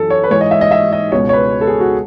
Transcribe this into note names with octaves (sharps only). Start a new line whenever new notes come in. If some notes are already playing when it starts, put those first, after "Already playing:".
Already playing: F#2 E3 A4
C#5
B4
G#2 E3 C#5
D#5
E5
D#5
E5
D#5
C#2 B2 C#5
C#5
B4
A4
G#4
F#4